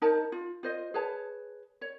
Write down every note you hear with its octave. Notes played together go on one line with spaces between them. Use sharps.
D#4 A#4 C#5 A5
F4
F4 C5 D#5
G#4 B4 C#5 A5
C#5